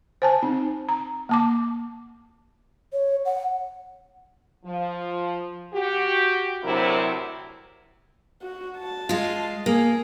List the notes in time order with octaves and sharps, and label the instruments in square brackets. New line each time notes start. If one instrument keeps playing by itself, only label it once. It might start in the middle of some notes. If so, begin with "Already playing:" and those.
[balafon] C5 G#5 A5
C4 D#4
A#5
A#3 A5 D6
[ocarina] C#5
F#5
[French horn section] F3
F#4 G4
D2 C3 F#3 C4 E4 A#4
[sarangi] F#4
A5
[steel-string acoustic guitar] G#3 F4
[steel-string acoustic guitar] A#3 [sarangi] G#4